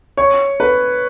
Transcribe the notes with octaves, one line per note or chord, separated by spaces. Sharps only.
C#5
B4